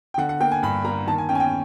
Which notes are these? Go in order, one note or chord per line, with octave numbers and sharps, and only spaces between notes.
G5
D3 F#5
F#5
A#3 G5
G#5
G2 B5
A#3 A#5
D#3 A5
G#5
C#4 G5
G#5
G5